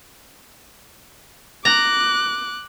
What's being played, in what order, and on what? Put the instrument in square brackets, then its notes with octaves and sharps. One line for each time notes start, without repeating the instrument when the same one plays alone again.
[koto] A#5 [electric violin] D6 F#6